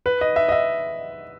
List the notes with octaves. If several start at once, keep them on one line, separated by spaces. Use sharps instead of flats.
B4
D#5
E5
D#5
E5